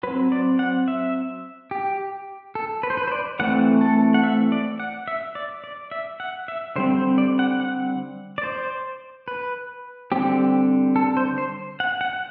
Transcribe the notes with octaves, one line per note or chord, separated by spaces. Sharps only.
F#3 C4 B4
D5
F#5
E5
G4
A4
B4
C5
B4
C5
D5
E3 A3 C4 F#5
A4
F#5
E5
D5
F#5
E5
D5
D5
E5
F#5
E5
D3 G3 C4 C5
C5
D5
F#5
F#5
D5
C5
B4
D3 G3 C4 G4
A4
C5
C5
F#5
F#5